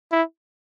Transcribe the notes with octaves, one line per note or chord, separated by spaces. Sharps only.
E4